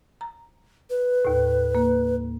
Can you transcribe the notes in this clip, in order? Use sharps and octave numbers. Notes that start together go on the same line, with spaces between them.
A#5
B4
D#2 A2
A#3